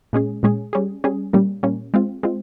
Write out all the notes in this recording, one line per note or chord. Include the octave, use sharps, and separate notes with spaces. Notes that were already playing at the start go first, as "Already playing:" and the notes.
A#2 G#3 C#4 G#4
A#2 G#3 C#4 G#4
G3 C#4 G#4
G3 C#4 G#4
A#2 G3 A#3 C#4
A#2 G3 A#3 C#4
G#3 C4 F4
G#3 C4 F4